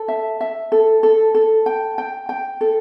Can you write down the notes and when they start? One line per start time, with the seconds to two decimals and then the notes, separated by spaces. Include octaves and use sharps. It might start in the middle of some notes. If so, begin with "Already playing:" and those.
Already playing: A4
0.08 E5
0.41 E5
0.72 A4
1.03 A4
1.34 A4
1.66 G5
1.98 G5
2.29 G5
2.61 A4